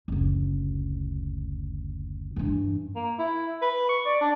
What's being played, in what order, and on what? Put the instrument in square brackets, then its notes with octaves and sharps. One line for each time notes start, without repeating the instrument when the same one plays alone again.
[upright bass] F#1 D2
G2 E3
[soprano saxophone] A#3
E4
B4
C#6
D5
D4